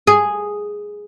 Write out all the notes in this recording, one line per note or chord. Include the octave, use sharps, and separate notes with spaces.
G#4